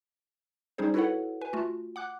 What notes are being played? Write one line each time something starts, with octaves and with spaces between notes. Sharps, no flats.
G3 C#4 D#4 G#4 C5
E4 F#4 A4 B4 C#5 F#5
B4 G#5
A3 F4 F#4
F#5 D6 F#6